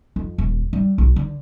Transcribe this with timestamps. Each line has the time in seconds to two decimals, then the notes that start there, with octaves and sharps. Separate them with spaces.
0.16 F2
0.38 D#1
0.73 G3
0.98 B1
1.16 D3